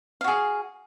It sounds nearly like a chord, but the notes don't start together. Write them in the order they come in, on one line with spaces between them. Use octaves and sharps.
F5 F#4 G#4